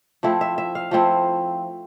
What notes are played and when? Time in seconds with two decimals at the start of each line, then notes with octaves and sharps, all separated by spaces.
0.23 F3 A3 C4 E4
0.41 E5
0.58 E5
0.75 F5
0.91 F3 A3 C4 E4